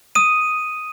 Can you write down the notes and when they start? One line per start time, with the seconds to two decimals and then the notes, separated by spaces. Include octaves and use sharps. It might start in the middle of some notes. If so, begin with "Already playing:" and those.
0.15 D#6 D#7